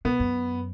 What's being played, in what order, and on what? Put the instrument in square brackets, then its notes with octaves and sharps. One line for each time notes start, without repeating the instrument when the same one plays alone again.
[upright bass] B2 [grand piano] B3
[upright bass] F#2